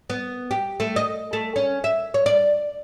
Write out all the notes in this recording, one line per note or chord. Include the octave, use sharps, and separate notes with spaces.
B3
G4
A3
D#5
A3
C#4
E5
C#5
D5